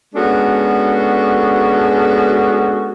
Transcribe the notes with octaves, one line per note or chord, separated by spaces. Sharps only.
G#3 B3 C#4 D4 F#4 A4